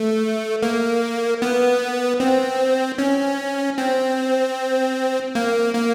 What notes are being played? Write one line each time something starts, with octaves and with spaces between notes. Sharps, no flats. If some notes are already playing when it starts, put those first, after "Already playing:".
Already playing: A3
A#3
B3
C4
C#4
C4
A#3
A#3